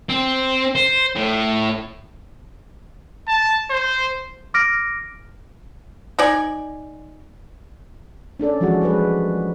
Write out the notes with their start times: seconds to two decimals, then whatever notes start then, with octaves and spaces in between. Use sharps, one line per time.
0.09 C4
0.75 C5
1.16 A2
3.28 A5
3.70 C5
4.54 D6 F6 A#6 D7
6.19 D#4 D5 G#5
8.40 C#4 D4 A4 D5
8.60 E3 F3 G#3 C#4 F#4 G#4
8.81 G3 G#3 B4